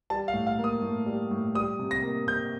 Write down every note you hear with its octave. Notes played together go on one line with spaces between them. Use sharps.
G3 A5
F5
A2
F5
A#3
D#6
A2
G3
A2
G3 D#6
C3
A#6
A#3
C3 G6